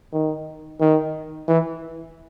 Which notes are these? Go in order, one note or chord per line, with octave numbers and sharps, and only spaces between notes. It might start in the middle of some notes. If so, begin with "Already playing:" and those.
D#3
D#3
E3